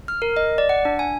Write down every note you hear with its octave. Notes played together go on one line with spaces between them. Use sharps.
F6
A#4
D#5
D5
F#5
D4
G#5